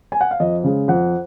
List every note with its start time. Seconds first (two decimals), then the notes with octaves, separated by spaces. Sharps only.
0.12 G#5
0.21 F#5
0.31 F5
0.40 F2 D#5
0.64 C#3 G#3
0.88 F2 F#5